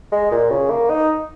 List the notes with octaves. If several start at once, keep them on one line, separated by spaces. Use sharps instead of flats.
G#3
A#2
C#3
A#3
D#4